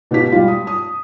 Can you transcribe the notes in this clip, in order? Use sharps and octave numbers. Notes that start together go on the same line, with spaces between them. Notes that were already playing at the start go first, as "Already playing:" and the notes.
B2 B3 F4 G4 B6
G3 F4
D#6
D#6